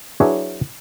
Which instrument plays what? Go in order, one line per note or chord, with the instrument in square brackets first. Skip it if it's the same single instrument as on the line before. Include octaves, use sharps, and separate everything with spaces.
[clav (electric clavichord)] F#3 D4 E4 G#4 B4 C#5